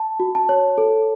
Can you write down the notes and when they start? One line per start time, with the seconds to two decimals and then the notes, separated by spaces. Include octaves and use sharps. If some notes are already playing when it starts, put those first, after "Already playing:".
Already playing: A5
0.20 F#4
0.35 A5
0.49 C#5
0.78 A4